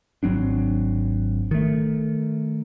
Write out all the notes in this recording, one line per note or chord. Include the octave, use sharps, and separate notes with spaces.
G#1 F#3 C4 D4
D#3 A3